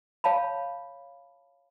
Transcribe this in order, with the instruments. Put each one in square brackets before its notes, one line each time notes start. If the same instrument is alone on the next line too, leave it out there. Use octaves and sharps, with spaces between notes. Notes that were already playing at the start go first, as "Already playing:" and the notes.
[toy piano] C#5 F5 A5 B5